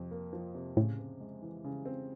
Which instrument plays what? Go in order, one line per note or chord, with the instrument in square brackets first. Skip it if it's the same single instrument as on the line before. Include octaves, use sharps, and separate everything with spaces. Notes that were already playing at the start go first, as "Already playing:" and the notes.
Already playing: [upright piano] F2 C3
A#3
F3
C3
[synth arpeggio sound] A2 [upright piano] C#3
[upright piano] C4
G#3
E3
C#3
C4